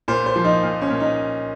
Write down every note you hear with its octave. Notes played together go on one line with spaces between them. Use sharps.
A#2 C5
C5
F3
D#4
A#2
C#4
A#2
D#4